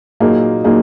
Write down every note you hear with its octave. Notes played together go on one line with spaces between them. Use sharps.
A#2 F#3 A#3 D#4 G#4
A#2 F#3 A#3 D#4 G#4